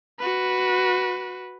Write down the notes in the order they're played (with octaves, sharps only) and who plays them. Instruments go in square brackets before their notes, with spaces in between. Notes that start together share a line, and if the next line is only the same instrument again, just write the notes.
[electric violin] F#4 B4